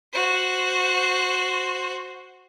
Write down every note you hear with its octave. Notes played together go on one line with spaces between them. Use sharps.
F#4 C5